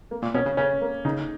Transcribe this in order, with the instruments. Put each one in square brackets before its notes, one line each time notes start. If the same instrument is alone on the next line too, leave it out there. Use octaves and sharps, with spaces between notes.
[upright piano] A#3
[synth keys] A#2
[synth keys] B2 [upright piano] C#4
[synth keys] C#3
[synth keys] C#3 [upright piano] C#4
[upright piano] A#3
[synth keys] C#3 [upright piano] D#4